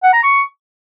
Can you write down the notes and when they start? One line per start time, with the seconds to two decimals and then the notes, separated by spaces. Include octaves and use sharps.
0.03 F#5
0.13 A#5
0.23 C#6